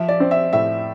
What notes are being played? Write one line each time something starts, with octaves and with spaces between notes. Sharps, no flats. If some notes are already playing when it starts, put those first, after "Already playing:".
Already playing: F3 E5
D5
C4
E5
A2 E5